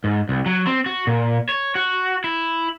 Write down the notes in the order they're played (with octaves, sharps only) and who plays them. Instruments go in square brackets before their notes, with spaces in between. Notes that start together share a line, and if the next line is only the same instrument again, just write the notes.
[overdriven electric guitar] G#2
C2
F#3
C4
F#4
A#2
C#5
F#4
E4